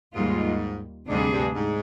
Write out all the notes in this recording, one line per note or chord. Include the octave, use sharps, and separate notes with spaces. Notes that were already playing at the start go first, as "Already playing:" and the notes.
D#2 G#2 D#3 G3 A#3 F4
D2 G#2 C3 G3 D4 G#4
G2
G#2